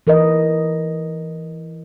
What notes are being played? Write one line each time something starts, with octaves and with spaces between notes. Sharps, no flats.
E3 A#4 B4 D#5